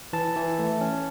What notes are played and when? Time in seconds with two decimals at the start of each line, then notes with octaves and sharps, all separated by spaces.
0.13 E3 A5
0.36 E3
0.59 A3
0.81 C#4